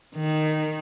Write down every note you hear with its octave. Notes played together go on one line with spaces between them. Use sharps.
D#3